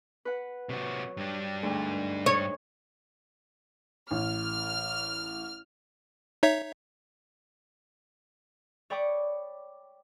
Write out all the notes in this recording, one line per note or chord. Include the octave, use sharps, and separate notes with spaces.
B4 F#5
C3 F#3 F#4
G2 D4
D2 G#2
C#5
A1 F6
D#4 C#5 E5
C#5 D5 G5 B5 D6 D#6